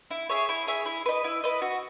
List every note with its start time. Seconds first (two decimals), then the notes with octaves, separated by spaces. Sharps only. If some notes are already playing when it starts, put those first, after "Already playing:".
0.11 E4
0.29 G#4 C#5 E5
0.49 E4
0.67 G#4 C#5 E5
0.86 E4
1.06 B4 D#5
1.24 E4
1.44 B4 D#5
1.62 F#4